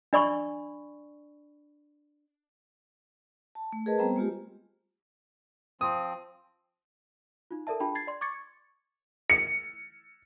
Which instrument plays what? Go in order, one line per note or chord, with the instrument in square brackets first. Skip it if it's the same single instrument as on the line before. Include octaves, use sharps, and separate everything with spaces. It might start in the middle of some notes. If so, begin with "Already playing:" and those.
[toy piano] D4 D5 B5 C#6
[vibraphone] A5
A3
G#4 A#4 B4 D#5 A5
G3 B3 C4 C5 G5 A#5
G#3 A3 F4 G4
[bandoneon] F3 C4 [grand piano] D#6
[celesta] D#4 F4
A4 A#4 D5 E5 A5
D4 F4 G#4 G5 A5 B5
G#6 A6 C7
D5 C6
C#6 D6 G#6 A6 C#7
[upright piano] C#7